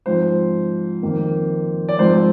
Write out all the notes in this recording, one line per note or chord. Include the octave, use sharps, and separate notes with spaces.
G#2 F3 C4 C5
F2 D#3 A#3
D5
G#2 F3 G#3 C4 C5